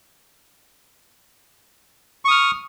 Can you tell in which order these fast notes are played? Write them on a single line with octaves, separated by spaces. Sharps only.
C#6 D#6 F6